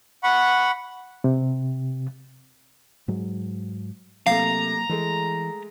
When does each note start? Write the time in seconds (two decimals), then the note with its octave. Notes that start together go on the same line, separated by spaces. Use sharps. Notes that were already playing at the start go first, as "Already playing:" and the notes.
0.23 F#5 B5 C#6
1.24 C3
3.08 G#2 F#3 G#3
4.27 C3 F#3 A3 A#3 F5 A#5
4.89 E3 G#3 A3